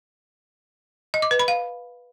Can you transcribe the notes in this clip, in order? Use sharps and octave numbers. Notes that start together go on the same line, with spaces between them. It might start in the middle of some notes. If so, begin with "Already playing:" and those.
D#5
D6
B4
B5
F5